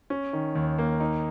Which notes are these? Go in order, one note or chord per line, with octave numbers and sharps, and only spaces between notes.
C#4
D#3
D#2
A#3
D#4